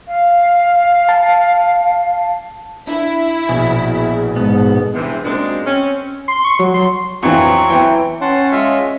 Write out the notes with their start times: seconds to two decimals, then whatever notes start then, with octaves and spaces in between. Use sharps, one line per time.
0.08 F5
1.09 A5
2.87 D4 E4
3.49 A#1 B2 G#4 G#5
4.36 G#2 B3 A4
4.95 E2 G2 C3 E3
5.24 F#2 A#2 G#3 C4 D4
5.66 C4 C#4
6.28 C6
6.45 C#6
6.59 F#3
6.74 C6
7.23 F2 E3 F#3 C4 C#6
7.70 E3 G5
8.22 C#4 F#5 A5 C6
8.52 G#3 F4 E5